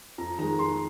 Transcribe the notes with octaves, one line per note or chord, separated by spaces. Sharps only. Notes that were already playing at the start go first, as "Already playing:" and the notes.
F2 A#5
D#3 G#3 A#5
F2 C6